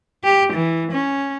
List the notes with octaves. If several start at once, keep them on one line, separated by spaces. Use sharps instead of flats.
G4
E3
C#4